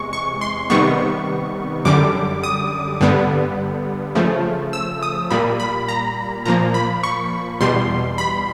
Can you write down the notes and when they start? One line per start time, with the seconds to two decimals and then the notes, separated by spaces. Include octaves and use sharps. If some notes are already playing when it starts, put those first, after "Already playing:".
Already playing: E2 C3 G#3 C#6
0.13 C#6
0.41 C6
0.70 C3 D#3 G3 B3 C#6
1.85 F#2 D3 G3 D6
2.44 D#6
3.01 G2 D3 G3 B3
4.15 C#3 F3 A3
4.73 E6
5.03 D#6
5.31 A#2 G3 A#3 B5
5.60 B5
5.88 A#5
6.45 A#2 F3 A#3 A#5
6.74 B5
7.03 C#6
7.61 E2 B2 G3 C6
8.18 B5